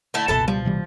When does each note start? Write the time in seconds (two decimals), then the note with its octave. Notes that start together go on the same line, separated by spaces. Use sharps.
0.14 D3 A3 E4
0.28 F#1 C#2 B2 E3 A4 A5
0.48 F3 G3
0.65 C3 E3 G3